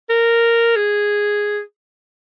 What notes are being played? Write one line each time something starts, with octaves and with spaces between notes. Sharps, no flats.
A#4
G#4